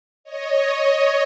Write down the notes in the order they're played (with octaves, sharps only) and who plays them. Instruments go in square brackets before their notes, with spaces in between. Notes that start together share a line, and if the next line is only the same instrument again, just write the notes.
[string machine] C#5 D#5